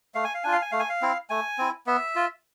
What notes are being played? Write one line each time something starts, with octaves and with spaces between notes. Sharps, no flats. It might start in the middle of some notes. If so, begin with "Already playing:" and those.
A3 F5
G#5
F5
D4 F4 G#5
F5
G#5
A3 F5
G#5
F5
C4 E4
A3 G#5
C4 E4
B3 E5
F4